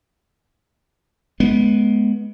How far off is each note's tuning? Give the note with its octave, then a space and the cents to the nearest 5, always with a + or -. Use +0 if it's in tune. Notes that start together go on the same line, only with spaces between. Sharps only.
G#3 +25 B3 -10